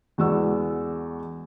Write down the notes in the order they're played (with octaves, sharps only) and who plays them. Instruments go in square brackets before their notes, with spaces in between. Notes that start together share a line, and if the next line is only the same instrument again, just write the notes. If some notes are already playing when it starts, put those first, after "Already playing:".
[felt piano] E2 G#3 F#4 D5 E6